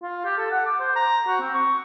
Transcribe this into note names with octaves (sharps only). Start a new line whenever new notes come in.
F4
G4
A4
F#5
D6
C5
A#5
F#4
C4
C#6